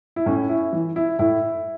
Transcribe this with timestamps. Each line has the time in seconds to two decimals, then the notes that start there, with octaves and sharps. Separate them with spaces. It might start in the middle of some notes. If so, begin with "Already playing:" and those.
0.16 E4
0.26 A2 C#4
0.49 E4
0.73 E3
0.96 E4
1.19 A2 E4